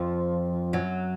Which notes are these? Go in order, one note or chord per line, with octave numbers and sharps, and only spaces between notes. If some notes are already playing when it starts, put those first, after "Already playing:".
Already playing: F2 F3
F#2 F#3